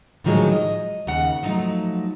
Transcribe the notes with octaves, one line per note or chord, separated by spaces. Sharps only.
A2 D3 D#3 F3 F#3 G#3
D#5
D#2 C#3 F#5
F3 F#3 A3 D#4